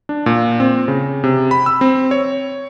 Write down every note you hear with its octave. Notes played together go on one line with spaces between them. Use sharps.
D4
A#2
C4
C#3
C3
B5
E6
C4
C#5